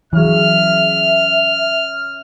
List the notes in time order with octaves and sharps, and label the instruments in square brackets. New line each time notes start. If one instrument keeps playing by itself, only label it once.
[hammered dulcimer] C#3 [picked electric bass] E3 F#3 [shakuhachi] E5 [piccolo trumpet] F6